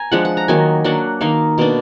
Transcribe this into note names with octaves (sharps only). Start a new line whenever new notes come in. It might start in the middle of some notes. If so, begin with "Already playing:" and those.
Already playing: G#5 A#5
F3 G#3 D4 F#5
F#5
A#5
D#3 F#3 A#3 D#4 G#5
F#3 A#3 D4 F#5
D#3 A#3 D#4 F5
B2 A#3 D4